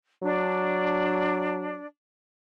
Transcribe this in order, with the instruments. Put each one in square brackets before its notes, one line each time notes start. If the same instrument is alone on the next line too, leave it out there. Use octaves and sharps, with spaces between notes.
[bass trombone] F#3 [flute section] D4